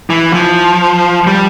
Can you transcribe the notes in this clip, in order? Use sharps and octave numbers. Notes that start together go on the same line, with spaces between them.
E3
F3
G3